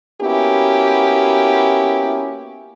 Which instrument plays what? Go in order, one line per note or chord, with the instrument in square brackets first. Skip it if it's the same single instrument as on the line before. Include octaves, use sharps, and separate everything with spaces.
[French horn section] A#3 B3 C#4 E4 F#4 G4